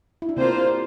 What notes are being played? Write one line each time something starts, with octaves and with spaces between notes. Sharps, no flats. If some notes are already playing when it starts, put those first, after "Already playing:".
E4
D4
C3 A#3 C4 F4 C5